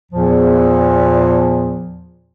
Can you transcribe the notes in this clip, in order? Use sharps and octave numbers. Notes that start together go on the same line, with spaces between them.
E2 A#2 F3